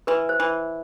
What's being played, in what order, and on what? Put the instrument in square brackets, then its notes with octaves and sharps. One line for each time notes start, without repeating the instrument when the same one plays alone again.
[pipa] E3 [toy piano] B4
[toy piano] C5
[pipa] E3